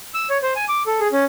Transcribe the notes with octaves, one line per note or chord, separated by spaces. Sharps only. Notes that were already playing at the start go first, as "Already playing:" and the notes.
E6
C#5
C5
G#5
D6
A4
G#4
C#4